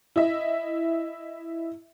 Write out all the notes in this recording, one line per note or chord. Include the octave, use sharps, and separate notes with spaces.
E4 D#5 E5